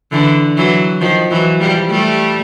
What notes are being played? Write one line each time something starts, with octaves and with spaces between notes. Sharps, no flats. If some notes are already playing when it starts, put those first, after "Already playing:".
D3 E3
E3 F#3
D#3 F3
E3 F#3
F3 G3
G3 A3